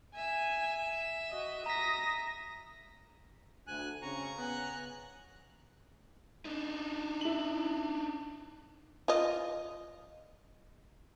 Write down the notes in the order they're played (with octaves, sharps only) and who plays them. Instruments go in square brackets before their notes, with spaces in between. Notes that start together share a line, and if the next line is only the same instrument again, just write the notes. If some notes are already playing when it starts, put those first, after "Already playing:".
[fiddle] E5 [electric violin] G#5
[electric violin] F#4 D#5
[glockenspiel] A#5 B6 [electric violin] D#6 A#6
[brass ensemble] D2 [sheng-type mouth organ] G#5 F#6
[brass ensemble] C#3 [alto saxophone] C4 [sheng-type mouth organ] A#5 [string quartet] C#6
[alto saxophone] B3 [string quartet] G#5 F#6
[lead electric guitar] D4 D#4
[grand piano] E4 F#7
[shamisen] F4 D#5